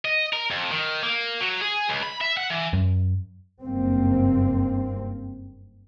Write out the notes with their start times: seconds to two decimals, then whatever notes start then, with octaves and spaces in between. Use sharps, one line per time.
0.05 D#5
0.33 A#4
0.51 F2
0.71 D#3
1.03 A#3
1.41 F#3
1.61 G#4
1.89 C#2
2.03 B5
2.21 E5
2.37 F#5
2.50 E3
2.73 F#2
3.62 F#1 G2 A#3 C4